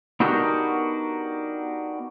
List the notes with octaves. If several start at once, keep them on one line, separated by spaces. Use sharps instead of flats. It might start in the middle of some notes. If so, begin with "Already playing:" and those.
B3 D4 D#4 F#4 G4 A#4